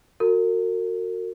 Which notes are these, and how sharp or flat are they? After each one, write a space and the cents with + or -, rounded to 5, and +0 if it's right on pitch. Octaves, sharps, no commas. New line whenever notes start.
F#4 -15 A#4 -40